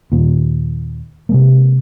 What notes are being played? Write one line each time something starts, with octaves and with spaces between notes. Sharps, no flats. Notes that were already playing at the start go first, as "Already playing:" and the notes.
D#2 A#2
C3 G#3 A#3